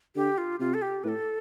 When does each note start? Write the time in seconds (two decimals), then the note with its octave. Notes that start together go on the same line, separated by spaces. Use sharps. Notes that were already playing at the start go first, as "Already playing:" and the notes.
0.16 D3 G4
0.38 F4
0.60 C3 F4
0.74 A4
0.82 G4
1.04 A2 A4 B4